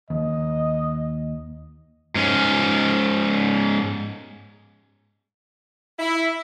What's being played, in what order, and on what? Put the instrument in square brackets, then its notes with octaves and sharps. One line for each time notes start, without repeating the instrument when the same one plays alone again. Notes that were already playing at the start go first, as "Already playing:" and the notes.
[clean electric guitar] D#2 [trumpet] D#5
[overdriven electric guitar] G#2 C#4
[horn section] E4